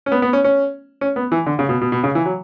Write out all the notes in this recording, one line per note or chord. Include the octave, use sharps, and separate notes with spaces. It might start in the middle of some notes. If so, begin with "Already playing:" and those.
C#4
B3
B3
C#4
C#4
C#4
B3
E3
D3
C#3
B2
B2
B2
C#3
E3
F#3